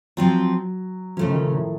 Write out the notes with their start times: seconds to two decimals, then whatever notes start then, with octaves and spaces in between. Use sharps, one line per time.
0.17 F3 F#3 C4 F4
1.17 C#3 F3 A3 C#4
1.29 D#3
1.42 A2
1.54 A2